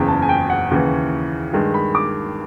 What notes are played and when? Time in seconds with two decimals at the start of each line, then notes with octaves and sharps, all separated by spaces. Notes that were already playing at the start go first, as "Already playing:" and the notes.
Already playing: F#1 E2 C#3 G5
0.08 A5
0.22 G#5
0.29 G5
0.50 F#5
0.71 D#2 C#3 E3
1.53 G2 D#3 G#3
1.74 B5
1.95 D6